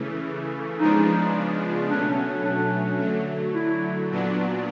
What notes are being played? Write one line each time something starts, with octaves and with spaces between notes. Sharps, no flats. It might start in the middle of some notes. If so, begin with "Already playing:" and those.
Already playing: C#3 E3 A3
C#3 F3 G#3 B3 D4 D#4
B2 F#3 A3 C#4 D4
D4
D3 F#3 A3
E4
A#2 F#3 B3 D4